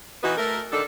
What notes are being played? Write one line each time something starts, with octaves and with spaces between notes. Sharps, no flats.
E3 B3 D#4 F#4 B4
A3 A#4
D#3 D4 A4